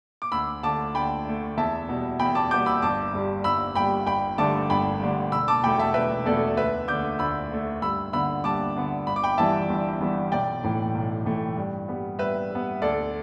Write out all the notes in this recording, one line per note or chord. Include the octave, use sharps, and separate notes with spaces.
D6
D2 B5 E6
D3 A3 A5 D6
D2 G5 B5
D3 A3
E2 E5 A5
B2 G3 B3
E2 G5 B5
A5 D6
B2 G3 B3 D6 G6
B5 E6
G1 A5 D6
G2 G3
G1 B5 E6
G2 G3 G5 B5
G1 G5 B5
G2 D3 A3 A5 D6
G1 G5 B5
G2 D3 A3
E1 B5 E6
A5 D6
E2 B2 A3 G5 B5
E5 A5
E1 B4 E5
E2 B2 A3 A4 D5
D2 B4 E5
D3 A3 D6 G6
D2 B5 E6
D3 A3
G2 B5 E6
D3 B3 B5 E6
G2 A5 D6
D3 B3
G1 B5
D6
G5 B5
G2 E3 G3 B3 E5 A5
G1
G2 E3 G3 B3
B1 D5 G5
A2 E3 A3
B1
A2 E3 A3
G2
G3 B3
G2 B4 E5
G3 B3
D2 A4 D5